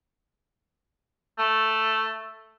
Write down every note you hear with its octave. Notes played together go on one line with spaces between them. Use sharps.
A3